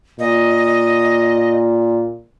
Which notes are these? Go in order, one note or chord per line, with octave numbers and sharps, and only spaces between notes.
A#2 D#5